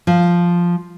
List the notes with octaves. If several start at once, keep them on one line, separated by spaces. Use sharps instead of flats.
F3